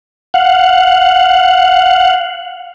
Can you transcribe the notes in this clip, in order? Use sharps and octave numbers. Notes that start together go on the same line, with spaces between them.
F5 F#5